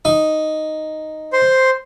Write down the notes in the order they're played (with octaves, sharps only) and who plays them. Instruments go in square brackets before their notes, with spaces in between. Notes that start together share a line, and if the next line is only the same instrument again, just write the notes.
[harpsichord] D#4
[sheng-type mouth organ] C5 C6